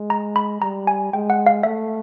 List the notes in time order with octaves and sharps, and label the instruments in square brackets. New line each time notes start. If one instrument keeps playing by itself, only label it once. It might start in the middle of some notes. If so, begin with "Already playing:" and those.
Already playing: [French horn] G#3
[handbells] A#5
B5
[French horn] G3 [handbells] A#5
[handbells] G#5
[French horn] G#3 [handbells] G5
[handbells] F#5
F5
[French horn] A3 [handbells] E5